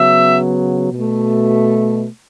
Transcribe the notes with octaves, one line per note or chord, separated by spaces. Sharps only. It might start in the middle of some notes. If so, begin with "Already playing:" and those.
Already playing: C#3 F#3 B3 E5
B2 A3